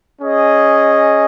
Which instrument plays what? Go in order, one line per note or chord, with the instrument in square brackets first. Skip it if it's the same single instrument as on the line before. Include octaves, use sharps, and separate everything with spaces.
[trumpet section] C#4 G#4 D#5